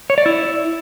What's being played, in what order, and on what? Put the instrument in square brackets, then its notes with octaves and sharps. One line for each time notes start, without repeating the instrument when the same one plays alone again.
[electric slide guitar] C#5
D5
E4